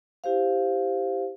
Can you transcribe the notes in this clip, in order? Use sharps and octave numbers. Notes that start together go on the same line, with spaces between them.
E4 G4 C5 F5